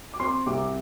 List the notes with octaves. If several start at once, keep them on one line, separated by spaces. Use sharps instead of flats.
D6
C4 C6
C2 D6